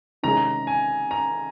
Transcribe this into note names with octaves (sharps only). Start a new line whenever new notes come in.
C3 D#3 G#3 C#4 G#4 A#5
G#5
A#5